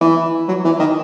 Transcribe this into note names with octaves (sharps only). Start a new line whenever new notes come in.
E3
F#3
E3
D#3